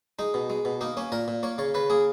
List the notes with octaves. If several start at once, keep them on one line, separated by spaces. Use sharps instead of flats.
G#3 D#4
B2
G#3
B2
A#3 D#4
A#3 C#4
A#2 A#4
A#2
A#3 C#5
C#3 C#5
C#3 B4
A#3 G#4